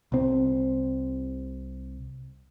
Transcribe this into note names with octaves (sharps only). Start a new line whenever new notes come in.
C2 C4